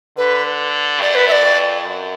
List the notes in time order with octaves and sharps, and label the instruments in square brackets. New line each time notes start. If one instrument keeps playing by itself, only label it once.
[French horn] D3 [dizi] B4
[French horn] F#2 [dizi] D5
[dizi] B4
E5
D5
[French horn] F2
F#2